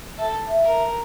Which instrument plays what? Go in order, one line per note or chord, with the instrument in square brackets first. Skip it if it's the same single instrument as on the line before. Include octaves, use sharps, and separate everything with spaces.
[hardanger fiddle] A4 [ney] E5
[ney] E5
[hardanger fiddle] A#4